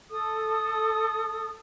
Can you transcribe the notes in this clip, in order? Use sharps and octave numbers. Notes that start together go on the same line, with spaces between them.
A4 D#6